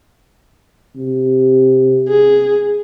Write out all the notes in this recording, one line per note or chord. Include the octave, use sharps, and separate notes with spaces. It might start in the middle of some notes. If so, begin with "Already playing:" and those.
C3
G#4